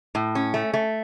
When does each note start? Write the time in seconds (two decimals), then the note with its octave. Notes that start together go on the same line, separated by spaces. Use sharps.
0.15 A2
0.35 C#4
0.54 A3
0.74 A3